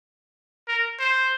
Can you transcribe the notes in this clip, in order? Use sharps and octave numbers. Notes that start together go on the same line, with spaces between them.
A#4
C5